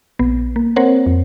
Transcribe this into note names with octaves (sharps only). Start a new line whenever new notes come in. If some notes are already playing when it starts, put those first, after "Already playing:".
A#1 B3
A#3
C4 A#4 C5 C#5 F#5
F2